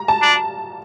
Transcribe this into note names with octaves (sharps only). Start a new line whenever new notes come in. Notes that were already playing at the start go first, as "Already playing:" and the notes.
Already playing: A#5
A5
D4